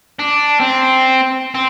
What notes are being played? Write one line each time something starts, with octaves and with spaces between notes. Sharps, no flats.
D4
C4
C4